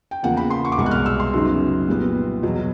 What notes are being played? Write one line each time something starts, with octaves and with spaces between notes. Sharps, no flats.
G5
E2 C#3 F3 A#3 F#5
B5
C6
C#6
D6
C2 B2 G#3 C#6
F#6
F6
E6
C6
F#2 C#3 F#3 B3 D#4
A#2 G3 B3
E2 B2 F#3